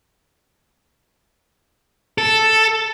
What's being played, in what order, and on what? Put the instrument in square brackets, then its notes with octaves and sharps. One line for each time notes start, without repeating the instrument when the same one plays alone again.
[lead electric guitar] A4